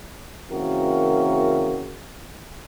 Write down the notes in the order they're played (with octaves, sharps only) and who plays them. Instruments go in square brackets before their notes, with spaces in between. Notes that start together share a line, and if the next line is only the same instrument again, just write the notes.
[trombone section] C#3 E3 A#3 C4 F#4 A#4